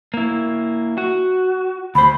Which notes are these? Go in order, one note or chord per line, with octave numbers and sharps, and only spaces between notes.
A#3 E4
F#4
D2 C5 B5